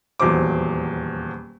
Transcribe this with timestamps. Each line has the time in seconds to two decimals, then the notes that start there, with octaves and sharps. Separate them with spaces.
0.20 D#1 E2 F#3 C5 D6